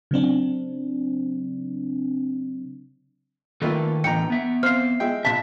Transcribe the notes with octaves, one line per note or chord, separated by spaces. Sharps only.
C#3 F#3 C4 D4
D#3 A3 A#3 F4 A4 B4
A2 D3 E3 G5 A#5 C#7
B3 E5
C4 C5 F5 F6 C7
G#3 E5 G5
A#1 E5 A5 B6